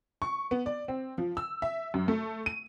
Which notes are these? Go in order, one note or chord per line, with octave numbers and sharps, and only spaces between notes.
C#6
B3
D5
C4
F3
E6
E5
F#2
A3
D#7